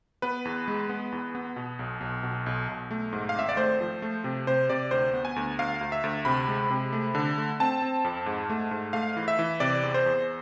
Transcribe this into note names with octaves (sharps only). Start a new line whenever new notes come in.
B3 B4
E2
G#3
B3
E2
B3
B2
B1
B1
B2
B1
B1
A3
G#2
F5
G#1 E5
D5
A3 C5
F3
A3
C3
C3 C5
C3 D5
D2 C5
B3
G#5
D2
D2 F5
D2
E5
D2
C3 B5
G#3
C3
A3
D3
A3
C4 A5
C4
F2
G#2
A3
G#2
A3 F5
E3
E5
E3
C3 D5
E2
C5
E2